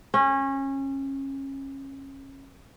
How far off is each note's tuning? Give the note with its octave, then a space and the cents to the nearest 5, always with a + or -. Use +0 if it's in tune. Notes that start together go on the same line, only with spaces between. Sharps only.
C#4 -25